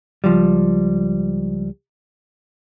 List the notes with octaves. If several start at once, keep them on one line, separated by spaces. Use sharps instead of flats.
C#2 F3 G3